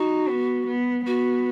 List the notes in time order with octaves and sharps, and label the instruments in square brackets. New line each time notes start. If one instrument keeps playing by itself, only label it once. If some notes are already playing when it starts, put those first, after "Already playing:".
Already playing: [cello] D#4 [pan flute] F#4
[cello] B3
B3
[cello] B3 [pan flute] F#4